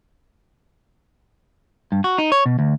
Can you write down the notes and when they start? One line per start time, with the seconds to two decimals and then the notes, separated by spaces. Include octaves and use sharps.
1.92 G2
2.04 F#4
2.18 D#4
2.32 C#5
2.46 B2
2.59 D2